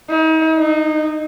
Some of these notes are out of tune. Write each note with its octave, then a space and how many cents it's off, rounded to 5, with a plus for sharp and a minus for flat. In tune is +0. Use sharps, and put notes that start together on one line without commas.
D#4 +40
D#4 -20